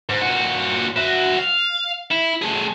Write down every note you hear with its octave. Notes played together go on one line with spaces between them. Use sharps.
G#2
A#2 F#4
F#4 E5
F5
E4
A3 G#4